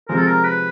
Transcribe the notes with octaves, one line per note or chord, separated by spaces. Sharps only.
C3 F3 G#3 A#4
A4
A#4
B4